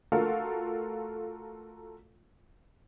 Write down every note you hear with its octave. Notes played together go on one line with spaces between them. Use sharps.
A3 F4 F#4 A4 A#4 F5